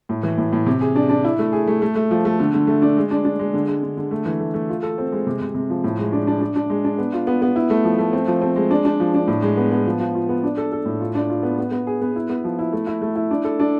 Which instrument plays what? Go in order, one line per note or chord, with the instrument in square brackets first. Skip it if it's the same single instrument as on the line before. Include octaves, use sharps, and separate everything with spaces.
[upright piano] A2
E3
A2
A2
C3
G#4
D4
D4
E4
A3
G#4
A3
A3
A3
F3
A3
D3
D3
A3
D4
G#3
D4
D4
G#3
D3
G#3
D3
D3
A3
E3
A3
A3
F4
A4
C4
G#3
C3
C3
C3
F3
A2
G#3
D4
D4
D4
D4
G#3
D4
B3
F4
B3
B3
E4
A3
F3
A3
C4
F3
C4
G#3
D4
D4
F3
D4
A2
G#3
B3
B3
F3
F3
F4
B3
D4
A4
A4
A2
F4
D4
F4
B3
B3
B3
G#4
B3
E4
B3
F3
E4
A3
E4
A3
E4
D4
A4
D4